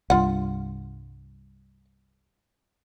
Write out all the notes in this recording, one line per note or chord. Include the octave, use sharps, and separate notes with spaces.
C2 G2 F4 F#5